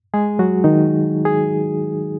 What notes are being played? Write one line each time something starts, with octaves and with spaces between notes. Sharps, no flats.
G#3 G#4
F#3 F#4
D#3 D#4
G#4